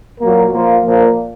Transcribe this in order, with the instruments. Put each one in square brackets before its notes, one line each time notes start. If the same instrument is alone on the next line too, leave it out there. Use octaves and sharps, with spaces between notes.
[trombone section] A#2 F#3 A#3
A#2 F3 A#3 F4
A#2 F3 A#3